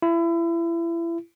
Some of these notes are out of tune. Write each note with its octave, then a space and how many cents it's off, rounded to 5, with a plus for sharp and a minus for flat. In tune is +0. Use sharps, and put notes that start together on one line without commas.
E4 +30